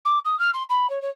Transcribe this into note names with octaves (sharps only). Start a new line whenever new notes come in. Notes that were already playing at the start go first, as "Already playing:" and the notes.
D6
D#6
F6
C6
B5
C#5
C#5